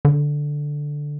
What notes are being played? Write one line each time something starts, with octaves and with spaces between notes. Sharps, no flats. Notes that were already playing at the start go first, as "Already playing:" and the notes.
D3